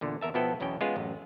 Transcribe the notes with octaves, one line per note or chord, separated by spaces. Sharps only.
E2 A#2 D3
E2 A#4 E5 A5
B2 F3 B3 E4 A4 G5
B1 E2 B2 C#4 G5
G#3 B3 C#4 F4 G#4
A1 F#2